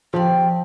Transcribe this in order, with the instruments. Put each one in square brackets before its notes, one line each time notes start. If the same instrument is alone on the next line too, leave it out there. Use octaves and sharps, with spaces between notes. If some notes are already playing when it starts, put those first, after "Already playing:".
[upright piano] F3 [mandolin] C4 G4 D5